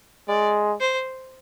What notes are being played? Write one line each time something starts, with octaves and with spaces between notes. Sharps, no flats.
G#3 D5
C5